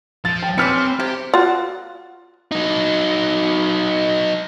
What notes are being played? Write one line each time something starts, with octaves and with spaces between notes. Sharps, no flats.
F3 A6
G5
C4 C#4 G4 B4 F6 B6 C#7
C3 G4
F4 F#4
F#3 D#4